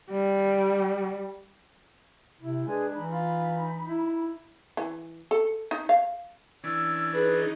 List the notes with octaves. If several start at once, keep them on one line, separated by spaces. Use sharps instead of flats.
G3
C3 E4
G#3 D4 G#4 B4 G#5
E3 D#4 B5
F4
E4
E3
A4
D#4
F5
E3 C#4 D4 E6
D#4 G#4 B4